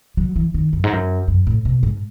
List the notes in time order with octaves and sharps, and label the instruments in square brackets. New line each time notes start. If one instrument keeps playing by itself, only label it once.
[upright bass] F#3
E3
D#3
F#2
G#2
F#2
F#2
A2
B2
G#2